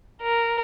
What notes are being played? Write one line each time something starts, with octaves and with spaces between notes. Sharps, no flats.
A#4